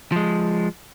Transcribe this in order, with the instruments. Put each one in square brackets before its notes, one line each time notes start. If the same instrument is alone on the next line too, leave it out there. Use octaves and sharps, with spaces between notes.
[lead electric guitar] F3 G#3